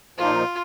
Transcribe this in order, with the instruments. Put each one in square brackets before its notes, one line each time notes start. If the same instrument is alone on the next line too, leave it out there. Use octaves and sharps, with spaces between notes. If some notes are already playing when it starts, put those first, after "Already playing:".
[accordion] A#2 F3 A#3 D#4 [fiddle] F4